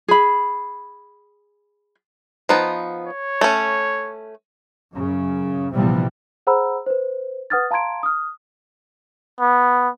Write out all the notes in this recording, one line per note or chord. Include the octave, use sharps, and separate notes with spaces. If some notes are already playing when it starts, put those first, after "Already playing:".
G#4 B5
F3 B3 D#4
C#5
A3 C#4
F#2 C#3
A#1 C3 E3 F3 G3 B3
G#4 C5 F#5 A#5 B5 E6
B4 C5
B4 F#5 D#6 F6 G#6 A6
F5 A5 A#5 C6 G#6 D7
D#6 F6
B3